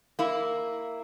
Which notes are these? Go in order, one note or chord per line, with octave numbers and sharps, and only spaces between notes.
A#3 E4